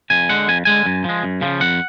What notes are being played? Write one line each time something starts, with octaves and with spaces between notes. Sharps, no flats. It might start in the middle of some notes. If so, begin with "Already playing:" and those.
F2 G#5
D3 G#3 F#5
F2 G#5
D3 G#3 G#5
F#2
F3 G#3
F#2
C#3 F3
F2 F#5